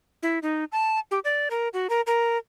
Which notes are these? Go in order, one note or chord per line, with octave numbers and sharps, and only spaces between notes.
E4
D#4
A5
G4
D5
A#4
F#4
A#4
A#4